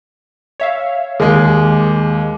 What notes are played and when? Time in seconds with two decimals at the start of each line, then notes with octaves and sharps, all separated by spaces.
0.60 C#5 E5 F5
1.20 D#2 G#3 G#4 A#4